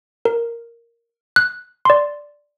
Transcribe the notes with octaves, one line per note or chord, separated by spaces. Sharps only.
A#4
F#6
D5 C6